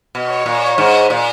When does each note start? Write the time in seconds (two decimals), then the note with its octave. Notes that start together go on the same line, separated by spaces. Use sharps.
0.15 B2
0.30 C#5
0.46 A#2
0.78 G#2
1.10 A#2